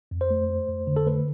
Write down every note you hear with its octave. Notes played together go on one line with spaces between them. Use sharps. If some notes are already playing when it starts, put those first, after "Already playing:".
F2
C5
A3
A3
F2
D3
A4
A3 B4